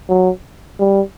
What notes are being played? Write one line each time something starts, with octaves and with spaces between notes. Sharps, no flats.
F#3
G3